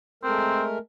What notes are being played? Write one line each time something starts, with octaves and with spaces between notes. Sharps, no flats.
G#3 A3 C4 A#4